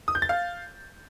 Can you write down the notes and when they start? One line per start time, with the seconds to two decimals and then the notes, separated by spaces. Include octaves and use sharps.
0.08 D#6
0.15 G6
0.22 A6
0.29 F5